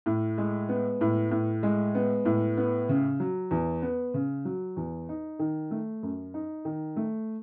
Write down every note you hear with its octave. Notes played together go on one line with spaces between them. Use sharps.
A2
G#3
B3
A2
A2
G#3
B3
A2
B3
C#3
F#3
E2
B3
C#3
F#3
E2
D#4
D#3
A3
F#2
D#4
D#3
A3